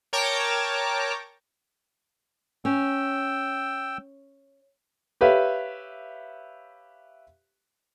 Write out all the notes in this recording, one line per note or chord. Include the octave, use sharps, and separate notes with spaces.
A#4 C#5 G5 A5 A#5 D6
C#4 G5 E6
G4 B4 C#5 E5 F5